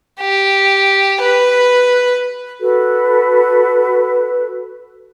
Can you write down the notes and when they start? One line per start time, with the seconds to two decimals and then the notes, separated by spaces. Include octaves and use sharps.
0.20 G4
1.21 B4
2.60 F#4 A4 B4